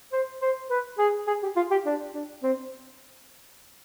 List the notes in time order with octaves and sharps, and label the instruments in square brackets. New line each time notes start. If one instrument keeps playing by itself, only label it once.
[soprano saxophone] C5
C5
B4
G#4
G#4
G4
F4
G4
D4
D4
C4